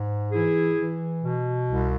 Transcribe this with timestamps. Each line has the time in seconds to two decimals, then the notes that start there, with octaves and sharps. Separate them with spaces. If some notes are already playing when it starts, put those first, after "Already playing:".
Already playing: G#2
0.31 E3 E4 G#4
0.77 E3
1.22 B2
1.68 C2